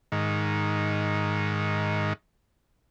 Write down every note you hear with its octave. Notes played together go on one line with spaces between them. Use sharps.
G#2 D#3